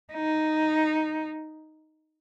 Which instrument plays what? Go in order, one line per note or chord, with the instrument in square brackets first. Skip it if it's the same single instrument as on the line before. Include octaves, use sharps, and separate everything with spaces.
[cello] D#4